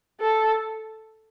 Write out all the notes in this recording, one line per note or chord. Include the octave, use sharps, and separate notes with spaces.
A4